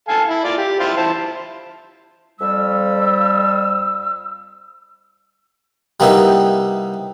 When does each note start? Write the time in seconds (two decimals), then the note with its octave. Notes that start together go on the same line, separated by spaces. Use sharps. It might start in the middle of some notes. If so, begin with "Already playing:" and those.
0.08 A4 F5 G#5
0.27 E4
0.45 F4 D5
0.57 G4
0.80 E4 F4 C5
0.97 E4 C5 A5
2.40 F2 G3 E6
6.00 C3 G3 A#3 B3 D#4 E4